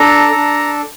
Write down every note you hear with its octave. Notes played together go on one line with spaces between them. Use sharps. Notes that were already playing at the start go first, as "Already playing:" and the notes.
Already playing: D4 A4 A#5
D4 A4